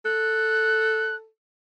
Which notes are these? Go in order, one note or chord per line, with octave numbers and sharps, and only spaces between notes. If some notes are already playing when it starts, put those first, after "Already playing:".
A4 F#6